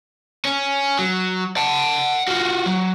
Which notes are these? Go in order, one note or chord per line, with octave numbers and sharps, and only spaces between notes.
C#4
F#3
F#5 A5
F4 F#4
F#3